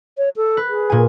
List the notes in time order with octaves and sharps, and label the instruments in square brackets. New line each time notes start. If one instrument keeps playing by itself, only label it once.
[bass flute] C#5
A4
[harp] B4
[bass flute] G#4
[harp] A#2 G#5